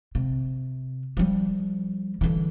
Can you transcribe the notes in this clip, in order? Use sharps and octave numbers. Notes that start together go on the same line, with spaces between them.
C3
F3 G3
D3 E3